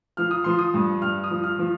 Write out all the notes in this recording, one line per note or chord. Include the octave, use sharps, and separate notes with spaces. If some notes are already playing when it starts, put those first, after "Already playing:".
F3 F6
D#6
F3 C6
D#6
G2
G2 F6
D#6
F3
F6
F3